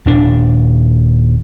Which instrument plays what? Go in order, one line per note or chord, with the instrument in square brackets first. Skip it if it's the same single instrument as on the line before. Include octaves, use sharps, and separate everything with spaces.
[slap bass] D#1 D4